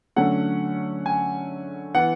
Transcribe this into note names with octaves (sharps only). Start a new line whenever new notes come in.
D3 F#3 A3 C#4 F#5
G#5
E3 B3 F#5